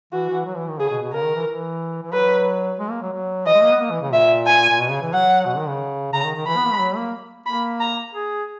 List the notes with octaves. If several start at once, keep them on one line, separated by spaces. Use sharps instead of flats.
E3 F#4
E3
F#3
E3
D#3
C#3 G#4
B2
B2
C#3 A#4
D#3
E3
E3
E3
F#3 B4
G#3
A#3
F#3
F#3
E3 D#5
G#3
A#3
B3
A#3
E3
C#3
A#2 E5
G#5
A#2
B2
C#3
E3
F#3 F#5
B2
D#3
C#3
C#3 A#5
D#3
D#3
E3 B5
B3
A#3
G#3
F#3
A#3
A#3 B5
A#5
G#4